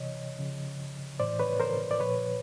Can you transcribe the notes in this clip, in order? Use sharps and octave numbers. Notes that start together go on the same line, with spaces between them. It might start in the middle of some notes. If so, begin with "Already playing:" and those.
Already playing: C3 E3 C#5 D#5
C#3 F3
A2 E3 C5 D5
B4 C#5
A#4 C5
D5
A#2 F3 B4 C#5